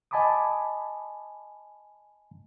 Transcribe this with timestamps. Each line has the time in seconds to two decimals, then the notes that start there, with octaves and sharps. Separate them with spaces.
0.11 D#5 G#5 A5 B5 D6 D#6